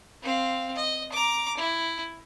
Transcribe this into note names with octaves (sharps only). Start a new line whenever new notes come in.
C4 F5
D#5
A#5 D6
E4